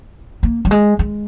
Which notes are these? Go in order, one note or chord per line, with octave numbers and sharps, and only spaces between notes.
A#3
G3
G#3
G#3